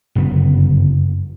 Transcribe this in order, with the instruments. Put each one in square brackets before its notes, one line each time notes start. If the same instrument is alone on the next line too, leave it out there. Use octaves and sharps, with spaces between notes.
[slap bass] G1 F#2 C#3 B3